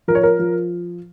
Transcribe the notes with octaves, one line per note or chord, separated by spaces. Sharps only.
F3 A#4
C#5
A#4
F3